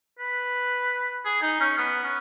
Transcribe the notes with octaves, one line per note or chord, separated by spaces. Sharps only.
B4
G#4
D#4
C#4
B3
C#4